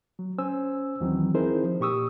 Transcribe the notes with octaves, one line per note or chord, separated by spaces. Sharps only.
F#3
C#4 C5 G#5 E6
D#2 D#3 E3 F#3 C4
C4 D#4 E4 G#4 A#4 C5
F3
A#2 G4 C#6 D#6 E6